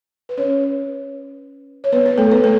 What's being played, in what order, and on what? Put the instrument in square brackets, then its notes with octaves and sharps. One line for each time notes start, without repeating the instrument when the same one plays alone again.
[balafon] B4
C#4 C#5
C#5
B3 B4
B3 B4
A3 A4
B3 B4
A3 A4